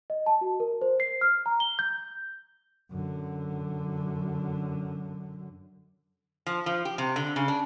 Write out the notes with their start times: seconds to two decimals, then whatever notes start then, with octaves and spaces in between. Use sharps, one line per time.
0.10 D#5
0.26 A5
0.41 F#4
0.60 A#4
0.82 C5
1.00 C7
1.21 F6
1.46 A#5
1.60 G7
1.79 G6
2.91 F#2 D3
6.46 F3
6.66 F3
6.85 G4
6.98 C3
7.16 D3
7.36 C#3
7.48 D4